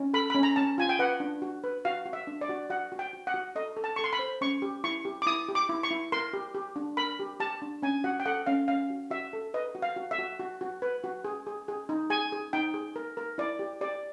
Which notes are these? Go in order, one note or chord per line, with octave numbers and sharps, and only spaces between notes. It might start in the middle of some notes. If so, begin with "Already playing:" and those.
Already playing: C#4
A4 B5
C#4 B5
A#5
C#4 A5
F4 G#5
G5
B4 F#5
D4
F#4
B4
F#4 F5
F#4
E5
D4
D5
F#4
F#4 F#5
F#4
G5
F#4
F#5
F#4
A4 D#5
A4
A5
A4 C#6
C6
B5
C5
C#4 C#6
G4
E4 C#6
G4
D6
E4 D#6
G4
D6
E4
C#6
E4
A#4 C6
G4
G4
D4
A#4 B5
G4
G4 A5
D4
C#4 G#5
F#4 F#5
G5
A4 F#5
C#4 F5
C#4 F5
F#4
F#4 E5
A4
B4 D#5
F#4
F5
F#4
E5
F#4
F#4
F#4
B4
F#4
G#4
G#4
G#4
D#4
G#4 G#5
G#4
D#4 G5
G#4
A#4
A#4
E4 D5
G4
G4 D5